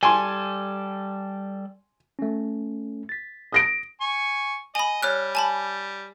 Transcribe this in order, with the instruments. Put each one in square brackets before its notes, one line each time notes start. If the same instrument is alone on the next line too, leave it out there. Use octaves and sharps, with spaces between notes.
[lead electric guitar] G3 A4 [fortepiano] G#5 C6
[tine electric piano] A3 C#4
A6 B6
[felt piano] D#6 A#6 D7
[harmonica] G#5 C#6
[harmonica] D#5 [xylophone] G#5 B5
[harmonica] G3 [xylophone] C#5 F6 F#6
[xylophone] G#5 A5 B5